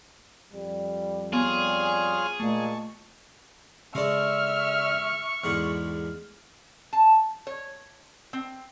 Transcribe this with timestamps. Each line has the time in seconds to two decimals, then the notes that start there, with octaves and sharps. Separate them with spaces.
0.52 F2 G3
1.33 B3 F4 G#4 C#5 F6
2.40 A#2 G#3 A3 A5 C#6
3.95 C#3 G#3 A4 D5 E5 C#6 F6
5.44 E2 G#2 D3 F6
6.93 A5
7.47 C#5
8.33 C4